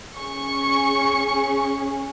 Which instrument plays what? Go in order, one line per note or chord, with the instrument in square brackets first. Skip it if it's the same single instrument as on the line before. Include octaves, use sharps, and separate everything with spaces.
[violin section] C#4 G#4 C#6